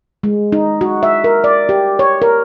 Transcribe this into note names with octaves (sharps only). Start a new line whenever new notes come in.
G#3
D#4
F#4
E5
A#4
D5
G4
C#5
A#4